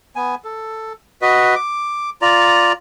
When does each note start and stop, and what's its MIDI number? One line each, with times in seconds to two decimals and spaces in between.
0.16 0.35 59
0.16 0.35 80
0.44 0.93 69
1.21 1.55 66
1.21 1.55 71
1.21 1.55 75
1.55 2.10 86
2.22 2.72 65
2.22 2.72 74
2.22 2.72 82